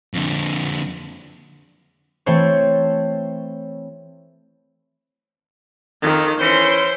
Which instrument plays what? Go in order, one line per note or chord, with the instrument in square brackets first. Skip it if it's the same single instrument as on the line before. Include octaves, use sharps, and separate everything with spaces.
[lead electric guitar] F2 D3
[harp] E3 A3 C4 A4 C5 C#5
[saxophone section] F2 [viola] D#3
[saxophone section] E3 C#4 [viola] C5 C6